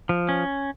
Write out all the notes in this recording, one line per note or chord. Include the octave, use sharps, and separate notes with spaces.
F3
C#4